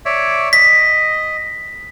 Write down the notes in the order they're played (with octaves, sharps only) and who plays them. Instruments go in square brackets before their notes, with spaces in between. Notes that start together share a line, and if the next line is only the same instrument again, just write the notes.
[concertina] C#5 D5 E5
[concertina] D#5 [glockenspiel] B6